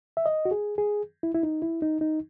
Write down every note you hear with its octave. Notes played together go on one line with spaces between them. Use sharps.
E5
D#5
F#4
G#4
G#4
E4
E4
D#4
E4
D#4
D#4